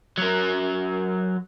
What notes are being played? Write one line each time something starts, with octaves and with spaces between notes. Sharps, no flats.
F#3 A#4